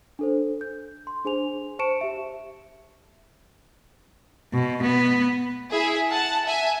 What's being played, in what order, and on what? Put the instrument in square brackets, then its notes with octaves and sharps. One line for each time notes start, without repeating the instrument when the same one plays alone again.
[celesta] D4 A4 C5
G6
C6
D4 G#4 C5 G#5 F7
C5 A5 C#6 C#7 D7 E7
G4 E5
[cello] B2
B3
[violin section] E4 G#4 E5
F#5 A5
E5 G#5